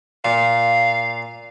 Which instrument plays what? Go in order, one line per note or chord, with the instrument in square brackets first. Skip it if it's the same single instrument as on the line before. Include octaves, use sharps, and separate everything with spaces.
[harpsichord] A#2 [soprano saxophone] F5